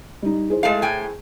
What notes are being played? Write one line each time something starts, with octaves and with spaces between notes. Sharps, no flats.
G3 D#4
E4 G#4 C5
G#3 A3 F5
A2 G5 G#5